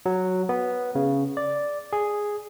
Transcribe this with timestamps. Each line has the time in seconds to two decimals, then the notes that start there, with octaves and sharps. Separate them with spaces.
0.06 F#3
0.49 B3
0.95 C#3
1.37 D5
1.93 G#4